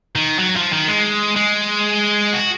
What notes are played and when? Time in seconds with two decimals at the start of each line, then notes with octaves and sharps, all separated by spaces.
0.16 D#3
0.39 F#3
0.56 F3
0.73 D#3
0.88 G#3
1.36 G#3
2.34 F#4